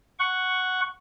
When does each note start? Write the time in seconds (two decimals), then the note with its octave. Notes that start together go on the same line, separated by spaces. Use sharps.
0.19 F#5 C#6